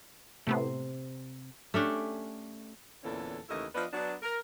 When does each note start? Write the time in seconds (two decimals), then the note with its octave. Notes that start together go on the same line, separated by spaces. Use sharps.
0.47 A2 C3 A3 B3 C5
1.74 A3 C#4 D4 G4
3.04 E2 A#2 D3 E3 C#4 A4
3.49 D#2 C#3 E3 A3 E4 D#5
3.75 F3 B3 D4 F4 B4 D#5
3.93 F#3 B3 D4
4.22 A#4